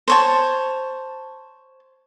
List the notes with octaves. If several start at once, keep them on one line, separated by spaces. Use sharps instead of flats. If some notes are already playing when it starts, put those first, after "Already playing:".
C5 C#5 A5